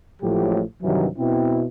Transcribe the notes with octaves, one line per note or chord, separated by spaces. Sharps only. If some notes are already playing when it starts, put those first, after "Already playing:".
A1 A2 F3 F#3 G#3 G4
G2 C3 D#3 E3 F#3
B2 C4 E4